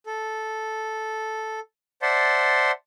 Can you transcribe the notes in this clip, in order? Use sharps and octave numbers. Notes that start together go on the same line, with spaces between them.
A4
C5 D5 E5 F#5 A5 C6